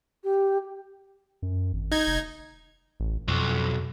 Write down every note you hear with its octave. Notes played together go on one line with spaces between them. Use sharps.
G4
F#2
G#1
D#4 G#6
F1
A1
B1 F2